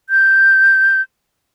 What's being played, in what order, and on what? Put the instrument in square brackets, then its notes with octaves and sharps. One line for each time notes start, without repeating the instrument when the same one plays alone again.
[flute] G6